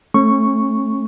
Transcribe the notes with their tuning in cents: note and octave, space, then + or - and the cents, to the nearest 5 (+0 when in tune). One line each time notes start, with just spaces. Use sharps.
A3 +0 C#4 -35 C#6 +0